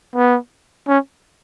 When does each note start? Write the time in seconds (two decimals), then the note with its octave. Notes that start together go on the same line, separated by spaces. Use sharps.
0.16 B3
0.87 C#4